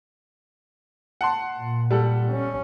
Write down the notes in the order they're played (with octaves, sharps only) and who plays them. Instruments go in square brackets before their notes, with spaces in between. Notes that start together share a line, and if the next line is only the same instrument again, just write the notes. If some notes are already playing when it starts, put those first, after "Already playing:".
[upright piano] F#5 A5 C6
[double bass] A#2
[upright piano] G3 A4 F#5
[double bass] C#4